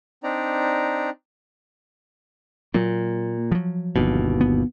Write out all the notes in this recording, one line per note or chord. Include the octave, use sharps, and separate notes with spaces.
C4 D4 D#4 D5 A#5
A#2 F#3 A#3
F3 F#3
G1 D#2 B2
B3